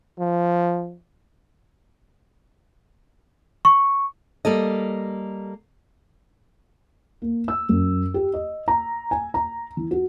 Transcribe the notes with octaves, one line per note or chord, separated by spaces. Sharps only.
F3
C#6
G3 A#3 A4 D#5
A#3
E6
F#2
G4
D#5
A#5
G#5
A#5
E3
F#4